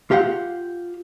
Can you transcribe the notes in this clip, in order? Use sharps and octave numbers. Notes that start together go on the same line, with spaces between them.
F4 G4 F5 F#5